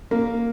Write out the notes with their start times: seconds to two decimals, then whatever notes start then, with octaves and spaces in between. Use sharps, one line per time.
0.11 A#3